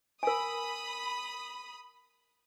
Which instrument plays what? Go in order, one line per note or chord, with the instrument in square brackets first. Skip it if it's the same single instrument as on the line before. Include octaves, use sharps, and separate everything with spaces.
[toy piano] A#4 G#5 [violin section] B5 D#6